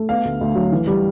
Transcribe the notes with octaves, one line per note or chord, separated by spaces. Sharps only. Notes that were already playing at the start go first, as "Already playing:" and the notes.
Already playing: A3
B3 F5
D2
D2
F#3
E3
G3